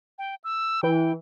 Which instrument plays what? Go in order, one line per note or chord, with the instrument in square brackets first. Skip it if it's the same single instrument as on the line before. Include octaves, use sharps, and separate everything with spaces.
[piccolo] G5
E6
[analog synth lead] E3 [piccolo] G5